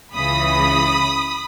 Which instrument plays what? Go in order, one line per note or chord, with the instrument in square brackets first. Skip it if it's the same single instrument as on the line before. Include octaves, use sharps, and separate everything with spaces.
[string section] C#2 C#3 E3 B5 D#6